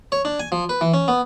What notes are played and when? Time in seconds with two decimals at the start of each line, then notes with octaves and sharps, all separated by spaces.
0.12 C#5
0.25 D4
0.40 G#5
0.52 F3
0.69 B4
0.81 E3
0.94 C#4
1.08 B3